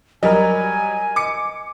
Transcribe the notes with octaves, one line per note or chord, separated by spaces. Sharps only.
F#3 G3 A#4 D#5 G#5
D6 C#7